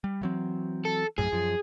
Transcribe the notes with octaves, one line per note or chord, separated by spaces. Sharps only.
G3
E3 F#3 C4
A4
A#1 F#2 A2 G#4
F#2 F3